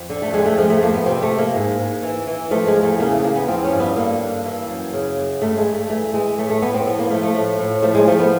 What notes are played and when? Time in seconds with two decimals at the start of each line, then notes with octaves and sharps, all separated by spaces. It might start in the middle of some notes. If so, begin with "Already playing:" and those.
Already playing: F2
0.10 D3
0.22 A3
0.34 F2 G#3
0.46 A3
0.58 F3 G#3
0.70 A3
0.83 F2 A#3
0.94 B3
1.06 C3 C4
1.22 A3
1.30 F2
1.38 A#3
1.55 G#2
1.78 G#2
2.03 E3
2.27 E3
2.51 F3 A3
2.67 G#3
2.76 E2
2.83 A3
2.99 C#3 A#3
3.11 A3
3.24 E2 A#3
3.36 B3
3.48 F3 C4
3.64 C#4
3.72 G2
3.80 B3
3.96 D3 A#3
4.21 G2
4.45 E3
4.69 F#2
4.93 C#3
5.17 F#2
5.41 G2 A3
5.57 G#3
5.65 G2
5.73 A3
5.90 E3 A3
6.14 E3 G#3
6.38 A2 A3
6.50 A3
6.62 A2 B3
6.74 C4
6.86 F3 B3
6.99 A#3
7.10 F3 A3
7.23 A3
7.34 A2 A3
7.59 A2
7.82 F3 A3
7.95 G#3
8.07 F3 A3
8.19 B3